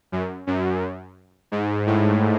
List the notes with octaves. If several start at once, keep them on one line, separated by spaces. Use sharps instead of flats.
F#2
F#2
G#2
A2